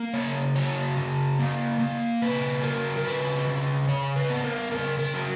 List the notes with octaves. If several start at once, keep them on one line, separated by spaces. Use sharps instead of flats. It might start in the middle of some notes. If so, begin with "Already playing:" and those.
Already playing: A#3
C#3 C#5
F#3 C#5
C#3
A#3
A#3
C#3 B4
F#3 A#4
A#4
C#3 B4
C#3
C#3 C#5
B4
B3
A#4
C#3 A#4
A#4
F#3